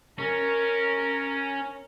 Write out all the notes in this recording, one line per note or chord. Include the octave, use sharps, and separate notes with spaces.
C#4 A#4